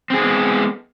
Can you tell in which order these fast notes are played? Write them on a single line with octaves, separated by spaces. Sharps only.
C4 G#4 G#3 B3